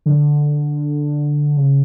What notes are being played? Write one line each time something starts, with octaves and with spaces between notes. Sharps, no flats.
D3
C#3